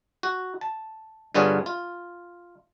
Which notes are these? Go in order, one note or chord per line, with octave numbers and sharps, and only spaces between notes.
F#4
A5
G2 D3 B3 F4 G#4 C#5
F4